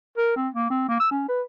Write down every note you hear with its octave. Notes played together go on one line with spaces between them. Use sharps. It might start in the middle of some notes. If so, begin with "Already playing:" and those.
A#4
C4
A#3
C4
A#3
E6
C#4
B4